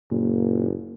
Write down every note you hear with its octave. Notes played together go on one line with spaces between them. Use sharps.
F#1 A#2